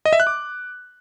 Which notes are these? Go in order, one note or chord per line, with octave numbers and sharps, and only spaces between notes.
D#5
E5
F#6
D6